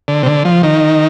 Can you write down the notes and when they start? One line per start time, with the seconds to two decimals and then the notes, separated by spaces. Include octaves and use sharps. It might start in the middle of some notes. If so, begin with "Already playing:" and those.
0.08 D3
0.23 C3
0.26 D3
0.45 F3
0.63 D#3